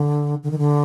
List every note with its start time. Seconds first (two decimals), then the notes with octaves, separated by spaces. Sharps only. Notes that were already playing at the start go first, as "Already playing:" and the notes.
Already playing: D3
0.43 D3
0.51 D#3
0.58 D3